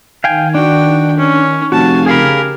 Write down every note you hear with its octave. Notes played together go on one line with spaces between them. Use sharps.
D#3 F5 G5 G#5
D4 F#4 G5
C#4
F1 F#4 F5 G#5 A5
C#3 G4 G#4 A#4 F5 B5